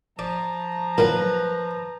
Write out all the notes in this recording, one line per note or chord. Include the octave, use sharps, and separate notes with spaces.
F3 D5 A#5
A#2 D#3 F#3 B4